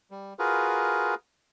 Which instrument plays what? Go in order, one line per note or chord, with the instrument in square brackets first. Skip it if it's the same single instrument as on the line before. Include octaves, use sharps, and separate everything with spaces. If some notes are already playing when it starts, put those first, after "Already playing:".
[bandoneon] G3
F4 F#4 G#4 A#4 B4